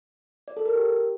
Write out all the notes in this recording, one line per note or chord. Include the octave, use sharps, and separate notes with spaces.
D5
A4
A#4
G4